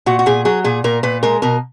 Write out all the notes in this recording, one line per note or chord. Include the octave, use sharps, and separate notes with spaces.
A#2 F#4
F#4
A#2 G#4
F#3 G#4
A#2 G#4
A#2 A#4
A#2 B4
G#3 A#4
B2 A#4